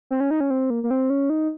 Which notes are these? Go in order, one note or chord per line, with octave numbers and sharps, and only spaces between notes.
C4
C#4
D#4
C#4
C4
A#3
A#3
C4
C#4
D#4